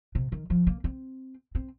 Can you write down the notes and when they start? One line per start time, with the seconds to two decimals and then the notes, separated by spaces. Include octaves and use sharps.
0.15 C3
0.32 D#3
0.50 F3
0.67 A#3
0.84 C4
1.55 C4